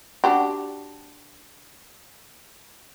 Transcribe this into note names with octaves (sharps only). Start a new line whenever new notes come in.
D4 F#4 G4